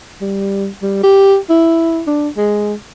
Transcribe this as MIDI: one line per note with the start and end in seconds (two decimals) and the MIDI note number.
0.21 0.68 55
0.82 1.01 55
1.03 1.37 67
1.50 2.01 64
2.07 2.29 62
2.37 2.74 56